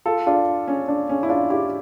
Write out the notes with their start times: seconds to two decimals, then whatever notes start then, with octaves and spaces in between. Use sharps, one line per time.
0.06 F4 A4
0.27 D4 F4
0.68 C#4
0.88 D4
1.09 C#4
1.23 E4
1.29 D4 F4
1.50 E4 G4